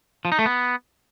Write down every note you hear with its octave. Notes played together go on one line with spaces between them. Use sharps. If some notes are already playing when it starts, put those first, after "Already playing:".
F3
D#4
A3
B3